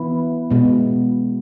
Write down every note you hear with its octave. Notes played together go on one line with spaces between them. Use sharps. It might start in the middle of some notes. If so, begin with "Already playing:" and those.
Already playing: E3 B3 E4 B4
B2 G#3 B3